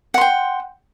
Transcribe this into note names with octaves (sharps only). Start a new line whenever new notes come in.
F#5 G5 C6